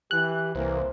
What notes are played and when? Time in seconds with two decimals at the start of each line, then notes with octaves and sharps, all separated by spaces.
0.11 E3 G4 F#6
0.55 C2 E3 A#3 C5